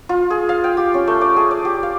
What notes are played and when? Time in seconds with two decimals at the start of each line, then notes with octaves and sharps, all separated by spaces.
0.09 F4
0.30 G#4
0.49 F5
0.64 G5
0.77 G4
0.94 C#4
1.07 A3
1.21 D5
1.36 G#4
1.51 D5
1.65 G4
1.83 F5